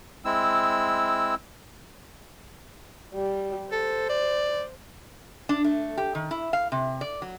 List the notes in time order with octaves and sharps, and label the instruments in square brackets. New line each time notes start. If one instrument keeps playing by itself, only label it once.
[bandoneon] G#3 C4 E4 E6
[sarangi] G3
[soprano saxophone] A4 [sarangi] C5
[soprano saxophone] D5
[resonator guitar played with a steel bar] D4
A3
G4
D#3
E4
F5
C3
D5
F#3